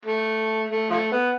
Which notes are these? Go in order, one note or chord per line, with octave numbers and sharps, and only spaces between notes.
A3
A3
F3 A3
B3